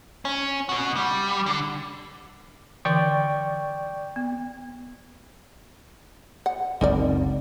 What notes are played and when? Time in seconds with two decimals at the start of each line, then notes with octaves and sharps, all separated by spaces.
0.25 C#4
0.69 B3 F#4
0.96 G3
1.46 D3
2.85 D3 E3 D5 G5 C#6
4.16 B3
6.46 F#5
6.81 F#1 C#2 C4 D#4 A#4 D5